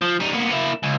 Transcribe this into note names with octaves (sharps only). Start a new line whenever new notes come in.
F3
G3 D#4
A#3 B3
A#3 E4
C#2